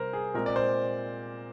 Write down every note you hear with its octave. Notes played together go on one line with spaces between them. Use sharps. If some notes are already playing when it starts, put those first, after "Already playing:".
Already playing: C3 G3 A#4 C5
G#4
A#2 G#3 C4 A#4
D5
C5